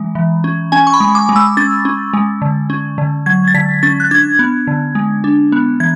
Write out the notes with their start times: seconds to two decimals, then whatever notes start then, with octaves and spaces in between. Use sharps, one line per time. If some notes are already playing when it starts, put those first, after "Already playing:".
Already playing: E3 G#3
0.15 E3
0.44 C#4
0.72 C#4 G#5
0.87 C#6
0.94 B5
1.00 G#3
1.15 D6
1.29 G#3
1.36 E6
1.57 C#4 A6
1.85 C#4
2.13 G#3
2.42 D3
2.70 C#4
2.98 D3
3.26 F#3 G#6
3.48 A6
3.54 D3 B6
3.83 C#4 A6
4.00 F#6
4.11 D4 G#6
4.39 B3
4.67 D3
4.95 G#3
5.24 D4
5.52 B3
5.80 E3 G#6